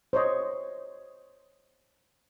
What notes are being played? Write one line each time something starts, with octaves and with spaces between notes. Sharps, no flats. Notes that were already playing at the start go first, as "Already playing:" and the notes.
C5 C#5 D#5